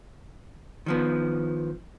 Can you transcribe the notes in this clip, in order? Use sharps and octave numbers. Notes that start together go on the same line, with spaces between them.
D#3 F3 B3